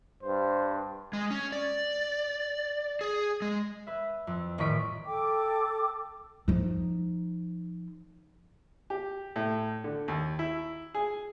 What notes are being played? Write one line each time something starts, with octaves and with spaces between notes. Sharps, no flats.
G2 C5
G#3
C#4
D5
G#4
G#3
B4 E5
F2
D#1 A1 D#5 C#6 B6 D7
A4 G5 D6
F3 D#4
G4
A2
D3
D#2
E4
G#4